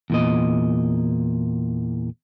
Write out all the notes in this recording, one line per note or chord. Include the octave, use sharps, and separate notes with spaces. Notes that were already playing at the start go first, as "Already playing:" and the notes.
E2 A#2 D#5